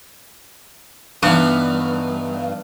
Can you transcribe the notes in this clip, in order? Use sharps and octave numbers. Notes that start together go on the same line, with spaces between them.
G2 E3 B3 D#4